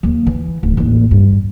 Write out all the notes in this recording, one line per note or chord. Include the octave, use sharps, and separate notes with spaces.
D#2 F3
E3
D1
A1 D#2
G2